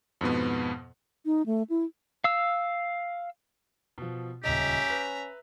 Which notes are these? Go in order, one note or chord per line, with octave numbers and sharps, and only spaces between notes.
F2 G#2 B2 B3
D#4
A3
E4
F5 E6
B2 F3
D#1 C#2 C#4 G4 D#5 E5 A#5
B4